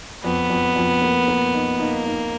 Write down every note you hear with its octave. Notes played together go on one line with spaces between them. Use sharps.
F2 B3
F2
F2
A#3
A#3
D#4
A#3 D#4
D#4